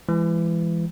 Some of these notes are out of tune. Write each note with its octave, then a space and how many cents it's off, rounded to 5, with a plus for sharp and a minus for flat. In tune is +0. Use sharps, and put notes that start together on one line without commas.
E3 +25 G#3 -10